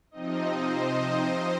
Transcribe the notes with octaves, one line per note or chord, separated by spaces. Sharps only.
C3 F3 C4 D#4 D#5
C5
D#5